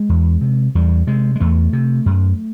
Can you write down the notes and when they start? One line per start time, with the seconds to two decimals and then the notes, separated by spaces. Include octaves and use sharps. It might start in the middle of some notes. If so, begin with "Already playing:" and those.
Already playing: G#3
0.09 E2
0.41 C3
0.75 E2 G3
1.07 C3 G#3
1.36 G#3
1.40 E2 A3
1.73 C3
2.06 F#2